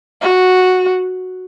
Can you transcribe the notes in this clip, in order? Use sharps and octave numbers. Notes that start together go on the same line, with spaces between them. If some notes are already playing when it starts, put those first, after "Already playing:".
F#4